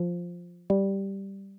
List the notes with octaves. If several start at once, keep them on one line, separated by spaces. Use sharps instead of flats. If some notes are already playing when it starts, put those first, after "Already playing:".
Already playing: F3
G3